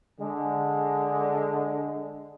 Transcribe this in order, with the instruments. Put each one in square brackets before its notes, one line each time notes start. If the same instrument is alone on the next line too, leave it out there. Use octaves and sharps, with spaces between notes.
[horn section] D3 G#3